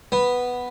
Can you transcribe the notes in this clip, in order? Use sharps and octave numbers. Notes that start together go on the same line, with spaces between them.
B3